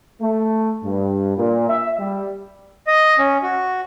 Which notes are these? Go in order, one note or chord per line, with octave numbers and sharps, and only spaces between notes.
A3
G2
A#2
E5
G3
D#5
C#4
F#4